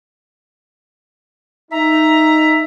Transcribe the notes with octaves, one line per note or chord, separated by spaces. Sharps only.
D#4 E5 A#5